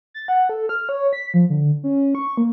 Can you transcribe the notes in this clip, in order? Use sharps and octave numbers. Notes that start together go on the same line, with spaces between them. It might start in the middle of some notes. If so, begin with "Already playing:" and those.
A6
F#5
A4
F6
C#5
B6
F3
D3
C#4
C#6
A#3